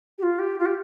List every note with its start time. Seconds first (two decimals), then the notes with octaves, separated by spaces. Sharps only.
0.18 G4
0.22 F4
0.38 G4
0.58 F4
0.65 G4